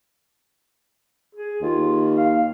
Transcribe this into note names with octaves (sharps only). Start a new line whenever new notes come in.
G#4
D#2 F4
F5